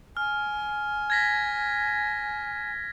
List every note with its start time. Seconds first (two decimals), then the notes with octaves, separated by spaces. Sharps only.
0.17 G#5 F6
1.10 G#6 A#6 B6